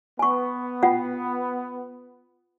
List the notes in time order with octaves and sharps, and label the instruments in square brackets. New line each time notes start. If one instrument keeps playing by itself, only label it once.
[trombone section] B3 [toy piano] G#5 C#6
[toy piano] F4 F#5 G5